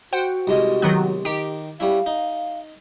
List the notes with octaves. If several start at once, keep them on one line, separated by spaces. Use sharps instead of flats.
F#4 C5 F#5 G5
C2 G#3 D#5
D#3 F#3 B3
D#3 G4
G3 C#4 E4 F5
D#4